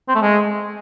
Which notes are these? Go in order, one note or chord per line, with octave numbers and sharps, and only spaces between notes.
C4
A3
G#3